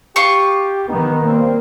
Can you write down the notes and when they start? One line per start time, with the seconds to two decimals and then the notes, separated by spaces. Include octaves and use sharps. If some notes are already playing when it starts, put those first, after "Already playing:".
0.16 F4 G4 C#6
0.89 D#3 B3 D#4
1.26 G3 A#3 C4